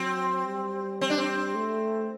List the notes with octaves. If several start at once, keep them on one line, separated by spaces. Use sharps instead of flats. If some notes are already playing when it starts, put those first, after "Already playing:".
Already playing: F#3 C4
G3
C4
D4
C4
A3